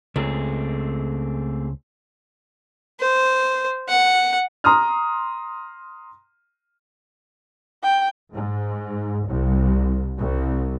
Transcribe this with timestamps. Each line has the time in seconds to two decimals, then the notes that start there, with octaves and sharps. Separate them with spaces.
0.16 C#2 A3 C4 G#4
3.00 C5
3.89 F#5
4.64 A#5 C6 D#6 F6
7.83 G5
8.33 G#2
9.27 C2
10.19 C2